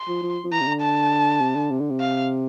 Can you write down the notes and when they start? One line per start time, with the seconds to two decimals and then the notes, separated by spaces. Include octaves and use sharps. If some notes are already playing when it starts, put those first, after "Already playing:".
Already playing: C6
0.08 F3
0.23 F3
0.44 F3
0.52 E3 A#5
0.61 C3
0.67 D3
0.81 A5
1.40 C3
1.55 D3
1.70 C3
1.80 D3
1.90 C3
2.00 F5